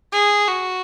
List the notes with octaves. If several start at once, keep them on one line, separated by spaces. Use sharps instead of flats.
G#4
F#4